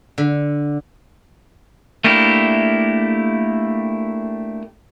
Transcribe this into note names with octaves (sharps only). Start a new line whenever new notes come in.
D3
A3 A#3 D4 E4 G4